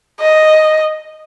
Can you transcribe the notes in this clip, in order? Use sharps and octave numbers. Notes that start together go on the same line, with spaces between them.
D#5